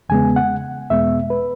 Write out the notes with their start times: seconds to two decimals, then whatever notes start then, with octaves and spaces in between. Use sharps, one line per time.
0.09 E2 C#3 G#3 B3 G#5
0.36 F#5
0.90 E2 B2 G#3 B3 E5
1.30 B4